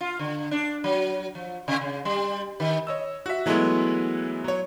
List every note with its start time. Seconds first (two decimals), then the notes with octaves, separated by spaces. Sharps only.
0.01 F4
0.19 D3
0.51 D4
0.84 F#3
1.35 F3
1.68 C3
1.81 C#3
2.05 G3
2.60 D#3
2.87 C#5 D#5 E6
3.26 F#4 E5
3.46 E3 F#3 G#3 A3 B3 E4
4.44 F#3 C#5